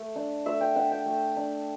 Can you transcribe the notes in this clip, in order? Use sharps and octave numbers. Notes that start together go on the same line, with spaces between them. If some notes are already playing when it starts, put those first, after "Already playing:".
Already playing: A3
D4
A3 E5
G5
D4 F#5
G5
A3
D4